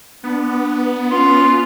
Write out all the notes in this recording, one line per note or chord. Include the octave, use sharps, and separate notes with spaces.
B3 D4
C#4 F4 C6